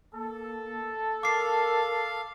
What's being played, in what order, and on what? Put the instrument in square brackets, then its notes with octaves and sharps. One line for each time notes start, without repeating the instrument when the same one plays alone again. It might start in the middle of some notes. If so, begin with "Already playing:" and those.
[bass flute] A#3 [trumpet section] A4
[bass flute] A#4 [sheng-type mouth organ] F5 [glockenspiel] D6 C7